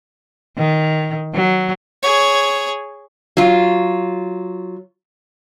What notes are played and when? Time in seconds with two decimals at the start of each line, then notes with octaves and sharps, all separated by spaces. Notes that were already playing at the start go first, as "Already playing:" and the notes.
0.57 D#3
1.34 F#3
2.02 G#4 C#5
3.37 F#3 F4